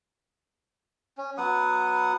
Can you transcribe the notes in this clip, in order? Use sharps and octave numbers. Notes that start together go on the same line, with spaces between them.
C#4
F#3 B3 F#5 D#6